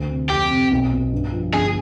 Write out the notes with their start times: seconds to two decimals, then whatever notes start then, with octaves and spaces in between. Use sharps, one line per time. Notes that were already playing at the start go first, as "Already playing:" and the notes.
Already playing: D2
0.10 C3
0.30 F2 G4
0.51 C3
0.71 B1
0.92 B2
1.13 G2
1.32 F3
1.54 G1 G#4